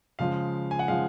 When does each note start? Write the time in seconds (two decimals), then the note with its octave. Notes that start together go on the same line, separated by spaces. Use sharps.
0.19 C#3 F3 G#3 F5
0.71 G#5
0.79 F#5
0.88 C#3 F3 G#3 F5